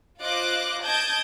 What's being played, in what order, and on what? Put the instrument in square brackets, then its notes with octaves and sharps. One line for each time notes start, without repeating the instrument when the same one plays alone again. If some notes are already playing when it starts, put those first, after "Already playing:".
[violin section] F4 C5 D#5 D6 F#6
D#5 A5 D#6 G6 G#6 D7